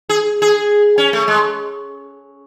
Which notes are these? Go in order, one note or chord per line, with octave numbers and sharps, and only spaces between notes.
G#4
G#4
C#4
A3
G#3